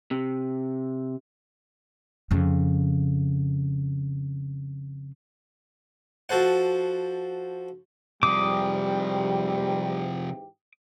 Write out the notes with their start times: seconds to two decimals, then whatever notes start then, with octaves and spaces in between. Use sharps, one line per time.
0.11 C3
2.31 F2 C#3
6.29 F3 F#4 A4 C5 F#5
8.23 G#2 C3 E3 F3 G3 G4 D6 D#6